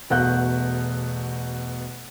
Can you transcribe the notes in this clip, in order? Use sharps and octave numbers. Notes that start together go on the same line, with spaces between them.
E1 B2 A3 F#5 F#6 G6